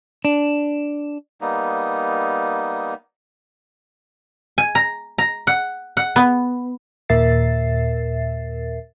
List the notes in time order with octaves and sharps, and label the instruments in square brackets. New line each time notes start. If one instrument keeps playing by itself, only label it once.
[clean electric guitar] D4
[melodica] G3 A#3 B3 D#4
[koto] G#5
A#5
A#5
F#5
F#5
B3
[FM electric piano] D#2 A#2 A#4 E5 A6 C7